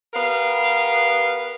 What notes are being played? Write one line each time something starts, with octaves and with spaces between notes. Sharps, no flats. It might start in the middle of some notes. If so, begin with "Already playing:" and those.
B3 G4 A#4 F5